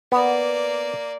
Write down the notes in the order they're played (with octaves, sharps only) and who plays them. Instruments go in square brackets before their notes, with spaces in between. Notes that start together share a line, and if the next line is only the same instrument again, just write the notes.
[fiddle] A#3 D5 [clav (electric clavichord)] B3